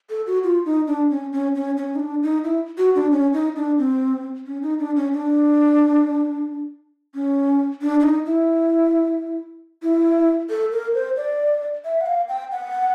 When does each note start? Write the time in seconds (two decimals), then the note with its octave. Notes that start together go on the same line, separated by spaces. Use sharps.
0.10 A4
0.27 F#4
0.44 F4
0.65 D#4
0.87 D4
1.10 C#4
1.33 C#4
1.55 C#4
1.77 C#4
1.95 D#4
2.00 D4
2.23 D#4
2.44 E4
2.78 F#4
2.95 D4
3.12 C#4
3.33 D#4
3.56 D4
3.78 C4
4.46 C#4
4.62 D#4
4.79 D4
4.96 C#4
5.13 D4
7.15 C#4
7.82 D4
8.00 D4
8.03 D#4
8.26 E4
9.83 E4
10.50 A4
10.72 A#4
10.94 C5
11.17 D5
11.85 E5
12.01 F#5
12.06 F5
12.29 G5
12.52 F#5